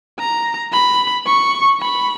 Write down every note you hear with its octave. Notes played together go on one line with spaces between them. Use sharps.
A#5
B5
C#6
B5